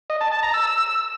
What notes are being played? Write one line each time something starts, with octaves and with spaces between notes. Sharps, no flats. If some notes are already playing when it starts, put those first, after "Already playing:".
D#5
A5
A5
A#5
E6